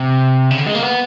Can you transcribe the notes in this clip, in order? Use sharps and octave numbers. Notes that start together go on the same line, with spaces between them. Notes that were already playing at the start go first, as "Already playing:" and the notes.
Already playing: C3
C#3
D3
G#3
A#3
B3